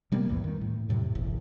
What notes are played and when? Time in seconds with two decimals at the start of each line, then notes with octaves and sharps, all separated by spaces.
0.12 C3 G3 A#3 B3
0.29 B1 E2 A2 E3
0.44 D#3
0.61 A2
0.89 F2 A2 C3 F#3
1.15 F#1 B1 E2